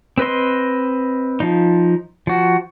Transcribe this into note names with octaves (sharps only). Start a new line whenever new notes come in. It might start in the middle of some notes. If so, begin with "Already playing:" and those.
C4 B4 D#5 C6
F3 D#4
F3 F#4